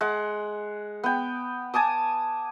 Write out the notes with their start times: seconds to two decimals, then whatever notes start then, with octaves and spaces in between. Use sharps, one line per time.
0.01 G#3 F#5
1.04 B3 G5
1.74 G#5 A5 D6 D#6